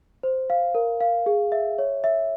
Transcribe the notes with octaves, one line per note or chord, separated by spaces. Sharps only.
C5
F5
A#4
F5
G#4
E5
C#5
E5